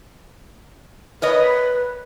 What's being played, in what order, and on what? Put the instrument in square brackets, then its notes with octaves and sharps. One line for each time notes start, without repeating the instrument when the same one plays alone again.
[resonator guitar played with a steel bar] A#4 C#5 D#5 [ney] B4